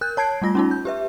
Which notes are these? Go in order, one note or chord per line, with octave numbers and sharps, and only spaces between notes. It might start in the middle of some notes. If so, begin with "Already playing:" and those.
A#4 F#6 G6
C#5 A5 G#6 C7 D7
G3 A3 F4 A#6
C#4 D#4 F4
G6
G4 B4 E5